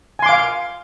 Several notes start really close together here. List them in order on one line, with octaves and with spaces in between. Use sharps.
G#5 C6 D6 F5